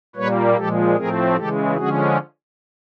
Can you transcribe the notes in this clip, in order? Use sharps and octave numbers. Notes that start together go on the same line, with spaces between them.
A#2 G3 A#3 B4 C#5
A#2 F3 G#3 G4 A4
A2 F3 A3 C4 G#4 A#4
C#3 E3 G#3 G4 A4
D3 F3 G#3 C#4 F#4 G#4